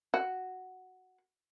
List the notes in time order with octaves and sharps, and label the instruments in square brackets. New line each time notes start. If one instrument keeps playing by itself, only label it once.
[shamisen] F#4